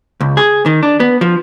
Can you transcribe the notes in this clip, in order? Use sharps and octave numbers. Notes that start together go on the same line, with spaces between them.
C#2
G#4
D#3
D4
B3
F3